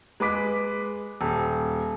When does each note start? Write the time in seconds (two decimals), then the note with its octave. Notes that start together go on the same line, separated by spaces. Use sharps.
0.20 G#3 B4 D6 B6
1.21 D#1